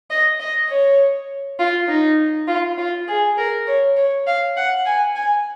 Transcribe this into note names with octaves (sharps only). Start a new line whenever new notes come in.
D#5
D#5
C#5
F4
D#4
F4
F4
G#4
A#4
C#5
C#5
F5
F#5
G#5
G#5